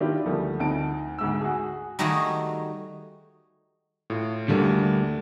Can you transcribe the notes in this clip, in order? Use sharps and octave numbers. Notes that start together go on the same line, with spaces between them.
D#3 D4 E4 F4 G4
D2 F3 G3 A3 A#3
D2 C4 D#4 A5 D7
D2 G#2 E6
F#4 G#4
D#3 G3 A3 F#4 G#4 C#5
A2 F4
D2 D3 G3 A3 A#3 D4